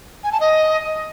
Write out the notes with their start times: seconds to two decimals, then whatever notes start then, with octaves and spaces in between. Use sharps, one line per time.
0.24 G#5
0.32 A5
0.40 D#5